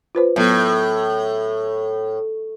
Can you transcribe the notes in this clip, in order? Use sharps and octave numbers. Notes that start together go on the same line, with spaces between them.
F4 B4 C5
A2 F#3 B3 A4